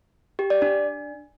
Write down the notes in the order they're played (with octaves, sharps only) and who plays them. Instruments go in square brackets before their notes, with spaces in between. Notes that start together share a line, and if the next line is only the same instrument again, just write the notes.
[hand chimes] G4
D5
D4